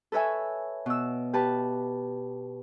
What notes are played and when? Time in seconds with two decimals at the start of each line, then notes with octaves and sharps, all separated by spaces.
0.12 A4 B4 C#5 E5 G#5
0.86 B2 E6
1.33 G4 B4 A5